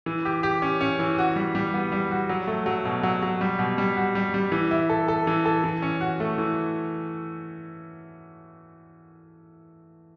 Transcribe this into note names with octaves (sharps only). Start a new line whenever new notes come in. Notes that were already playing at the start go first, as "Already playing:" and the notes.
E3
G4
G4
C#4
C#4
E3
F#4
G3
G3
B3
G3
F#4
F#3
A3
F#3
B2
F#3
F#3
G3
B2
G3
F#4
G3
G3
E3
E4
A4
A4
E3
A4
E3
C#4
F#4
A3
E3